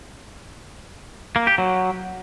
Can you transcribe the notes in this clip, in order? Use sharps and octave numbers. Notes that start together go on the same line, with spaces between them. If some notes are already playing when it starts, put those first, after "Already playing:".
A#3
G4
F#3